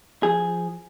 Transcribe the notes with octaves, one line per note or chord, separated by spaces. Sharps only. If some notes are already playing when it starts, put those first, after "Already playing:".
F3 G#4